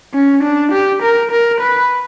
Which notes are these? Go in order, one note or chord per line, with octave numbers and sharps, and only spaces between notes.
C#4
D4
G4
A#4
A#4
B4